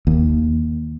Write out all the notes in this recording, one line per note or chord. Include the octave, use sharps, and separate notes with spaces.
D#2